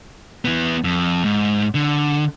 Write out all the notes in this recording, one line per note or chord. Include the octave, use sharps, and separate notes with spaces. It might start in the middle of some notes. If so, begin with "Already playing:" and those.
E3 B3
F2
G#2
D3